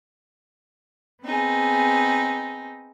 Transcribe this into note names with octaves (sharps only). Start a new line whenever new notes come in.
B3 C4 D#4 G#4